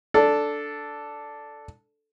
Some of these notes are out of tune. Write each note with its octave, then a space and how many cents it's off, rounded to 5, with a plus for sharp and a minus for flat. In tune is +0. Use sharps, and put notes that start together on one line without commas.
D4 -5 A4 +0